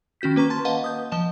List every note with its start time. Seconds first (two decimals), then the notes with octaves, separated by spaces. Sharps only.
0.21 D#3 C#4 F#4 G6 B6
0.36 A#3 B4 A#5 C#6
0.50 A5 C6 A6
0.65 B4 D#5 F5 F#5 A5
0.84 D#6 G6
1.12 F3 D#5 A5 E7